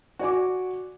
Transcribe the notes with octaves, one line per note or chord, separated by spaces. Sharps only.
F#4 D5 G#5 D6